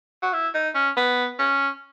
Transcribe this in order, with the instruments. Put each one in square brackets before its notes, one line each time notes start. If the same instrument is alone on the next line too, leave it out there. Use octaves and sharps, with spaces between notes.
[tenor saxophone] F#4
E4
D#4
C#4
B3
C#4